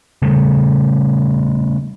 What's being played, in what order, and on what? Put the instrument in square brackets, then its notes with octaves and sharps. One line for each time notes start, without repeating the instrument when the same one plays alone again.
[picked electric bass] C#3 G3 A3